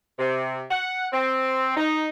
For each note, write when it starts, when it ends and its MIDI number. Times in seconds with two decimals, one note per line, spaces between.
0.18 0.63 48
0.69 1.05 78
1.12 1.73 60
1.76 2.07 63